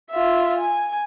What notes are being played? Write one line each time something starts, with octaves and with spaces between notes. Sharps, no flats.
F4 E5
G#5